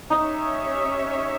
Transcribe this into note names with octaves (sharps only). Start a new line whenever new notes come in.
C#4 D#4 G4 C#5 E5